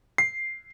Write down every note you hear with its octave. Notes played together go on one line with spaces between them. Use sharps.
C7